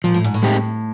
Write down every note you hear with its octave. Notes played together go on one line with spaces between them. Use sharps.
A#2 F3
A2
G#2
A2
G#3 C4 D#4 G4